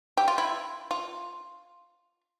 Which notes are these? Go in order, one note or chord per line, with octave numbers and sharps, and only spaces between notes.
G4
F4
E4
F4